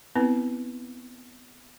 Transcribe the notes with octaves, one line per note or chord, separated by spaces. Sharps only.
B3 C4 E4 B4